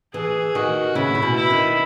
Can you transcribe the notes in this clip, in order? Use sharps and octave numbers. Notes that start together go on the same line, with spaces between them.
E3 G#4
D#3 F#4
C#3 E4
C#3
B2
E4
D#3